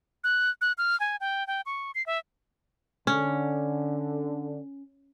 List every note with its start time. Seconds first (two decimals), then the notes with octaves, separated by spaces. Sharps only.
0.24 F#6
0.61 F#6
0.78 F6
1.00 G#5
1.20 G5
1.47 G5
1.66 C#6
1.95 C7
2.06 E5
3.07 D3 C#4